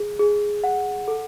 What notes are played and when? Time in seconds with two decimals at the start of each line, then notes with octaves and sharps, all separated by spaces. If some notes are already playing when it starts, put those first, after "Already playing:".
Already playing: G#4
0.19 G#4
0.64 F#5
1.08 A4